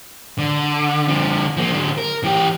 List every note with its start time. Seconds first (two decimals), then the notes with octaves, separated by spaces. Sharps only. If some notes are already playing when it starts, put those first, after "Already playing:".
0.39 D3
1.08 D3 F3
1.57 F3 A#3
1.72 D3 F#3
1.98 A#4
2.24 E3 G4